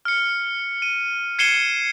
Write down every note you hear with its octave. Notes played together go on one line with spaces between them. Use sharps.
F6 C#7
D#7
G#6 C7 C#7 D#7 E7 G7